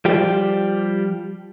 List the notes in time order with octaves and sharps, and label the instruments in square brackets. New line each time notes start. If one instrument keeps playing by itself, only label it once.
[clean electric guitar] F3 G3 G4